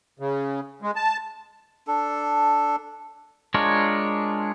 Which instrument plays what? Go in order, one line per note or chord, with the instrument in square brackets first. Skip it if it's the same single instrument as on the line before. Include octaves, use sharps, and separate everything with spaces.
[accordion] C#3
G#3
A5
[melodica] D4 A4
[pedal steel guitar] G#3 D4 F4 A#4 C#5